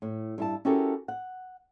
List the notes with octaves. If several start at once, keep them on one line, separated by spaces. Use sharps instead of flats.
A2
G2 E4 A5
C#4 E4 F#4 G4 A4 A#4
F#5